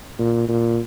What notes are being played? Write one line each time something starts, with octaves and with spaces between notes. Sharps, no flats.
A#2
A#2